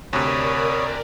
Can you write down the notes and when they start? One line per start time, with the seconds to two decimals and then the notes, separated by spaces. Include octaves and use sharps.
0.13 D2 C3 A#4 C#5 D5 B5 D#6